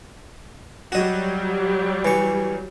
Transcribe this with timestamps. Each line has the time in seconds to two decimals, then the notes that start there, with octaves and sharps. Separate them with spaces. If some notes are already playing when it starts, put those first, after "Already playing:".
0.92 F#3 G3 F#4 D#5
2.05 E3 C#6